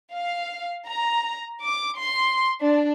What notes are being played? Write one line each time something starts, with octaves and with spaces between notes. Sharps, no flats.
F5
A#5
D6
C6
D4